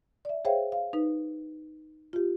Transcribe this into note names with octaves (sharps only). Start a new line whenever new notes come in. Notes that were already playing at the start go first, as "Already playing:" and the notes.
D5 E5
G#4 C5 C#5 E5 F5 G5
F5
D#4 B4
F4 G4